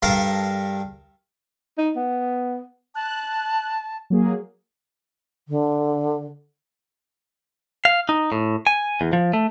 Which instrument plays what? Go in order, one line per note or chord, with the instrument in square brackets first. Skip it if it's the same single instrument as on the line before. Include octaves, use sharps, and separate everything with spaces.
[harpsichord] G2 A4 A#4 F5
[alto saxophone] D#4
B3
[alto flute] A5 [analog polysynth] F#6
[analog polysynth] F#3 A#3 G#4
[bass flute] D3
[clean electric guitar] F5
D#4
A2
G#5
E2
F3
A3